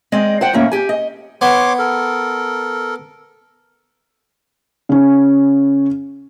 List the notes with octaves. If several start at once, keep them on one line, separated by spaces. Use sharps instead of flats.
G#3 C4 D5 D#5
C5 D5 F#5 G5
D#2 A2 A#3 C#4 E5
G4 G#5
D#5
B3 C#5 C6 D6
A4 A#4
C#3 C#4